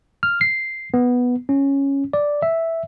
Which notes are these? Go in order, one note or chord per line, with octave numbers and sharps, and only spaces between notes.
F6
C7
B3
C#4
D5
E5